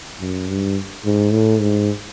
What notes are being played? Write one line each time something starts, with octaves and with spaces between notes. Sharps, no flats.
F#2
G2
G#2
A2
G#2